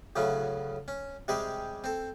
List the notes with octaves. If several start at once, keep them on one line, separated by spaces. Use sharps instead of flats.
D2 A2 C#3 F#3 C#4
C#4
C3 G3 G#3 G4 G#4
C4 A4